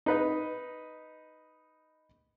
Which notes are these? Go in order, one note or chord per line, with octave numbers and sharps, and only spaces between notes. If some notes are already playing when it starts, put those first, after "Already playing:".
D#4 B4 D#5